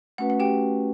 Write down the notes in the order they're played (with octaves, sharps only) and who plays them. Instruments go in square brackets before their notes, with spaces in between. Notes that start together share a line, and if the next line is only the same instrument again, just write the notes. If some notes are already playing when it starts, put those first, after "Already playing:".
[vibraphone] A3 C#4 F#4 B4 [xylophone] F#5
[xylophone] F#5
G4 G5